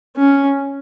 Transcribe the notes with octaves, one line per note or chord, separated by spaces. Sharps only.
C#4